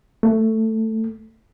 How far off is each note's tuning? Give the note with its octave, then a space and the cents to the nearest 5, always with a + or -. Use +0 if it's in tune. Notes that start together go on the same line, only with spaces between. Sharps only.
A3 +10